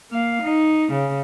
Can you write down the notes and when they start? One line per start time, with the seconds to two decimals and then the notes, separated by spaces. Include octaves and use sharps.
0.11 A#3 F5
0.43 D#4
0.92 C#3